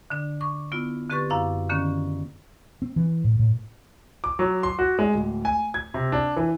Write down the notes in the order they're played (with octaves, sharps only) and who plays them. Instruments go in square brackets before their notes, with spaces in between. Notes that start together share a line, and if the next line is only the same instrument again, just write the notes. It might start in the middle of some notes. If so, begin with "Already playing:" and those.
[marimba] D3 D4
C#6 D6
B3 E4 F4
D3 C4 G4 B4 C#6 A6
F#2 E4 F5 D6
D3 D#3 A#3 C#4
[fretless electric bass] C4
E3
A2
A2
[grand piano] D6
F#3
C6
F#4
G#3
D1
G#5
G#6
C3
D4
E3